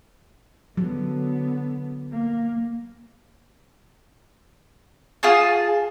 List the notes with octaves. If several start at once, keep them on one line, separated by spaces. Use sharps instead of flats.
D3 F#3 B3
A#3
F4 G#4 A5